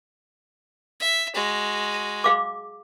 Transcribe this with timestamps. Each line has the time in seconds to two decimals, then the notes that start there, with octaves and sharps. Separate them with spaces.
1.00 E5
1.35 G#3 F#4
2.24 G#4 F5 D6